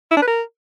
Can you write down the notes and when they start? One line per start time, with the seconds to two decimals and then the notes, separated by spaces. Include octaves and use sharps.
0.11 E4
0.17 D4
0.22 B4
0.28 A#4